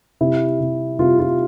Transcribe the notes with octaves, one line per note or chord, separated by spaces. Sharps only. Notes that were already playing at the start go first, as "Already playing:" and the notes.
C3 E4
C3
C3 F4
F4